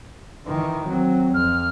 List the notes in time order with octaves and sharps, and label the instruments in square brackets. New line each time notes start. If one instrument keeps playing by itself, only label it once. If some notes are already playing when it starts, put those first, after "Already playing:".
[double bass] D#3 E3
[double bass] F#3 [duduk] C4
[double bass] F2 [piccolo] F6